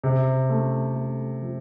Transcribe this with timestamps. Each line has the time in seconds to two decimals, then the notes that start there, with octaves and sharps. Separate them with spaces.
0.04 C3
0.50 A3
0.95 A3
1.41 F3